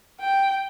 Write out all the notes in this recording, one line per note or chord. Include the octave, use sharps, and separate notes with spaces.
G5